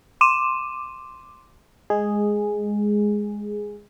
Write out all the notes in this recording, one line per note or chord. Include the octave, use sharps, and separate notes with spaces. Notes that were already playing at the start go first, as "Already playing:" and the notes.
C6 D6 D#7 E7
G#3 G#4